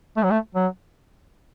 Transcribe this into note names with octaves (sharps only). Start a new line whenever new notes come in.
A3
F#3
A3
F#3